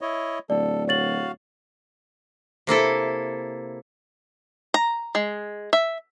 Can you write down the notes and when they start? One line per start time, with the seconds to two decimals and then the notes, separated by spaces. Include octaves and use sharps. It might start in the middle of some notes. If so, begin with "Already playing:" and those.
0.01 E4 C#5 D#5
0.50 D1 A4 D5
0.88 F#4 C#5 F5 A6 F#7
2.67 C3 A#3 E4 A4
4.74 A#5
5.15 G#3
5.73 E5